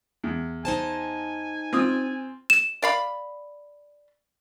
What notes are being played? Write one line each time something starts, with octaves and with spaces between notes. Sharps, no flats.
E2
D#4 C5 G#5 A5
C4 F4 D#6
E7
D5 F5 B5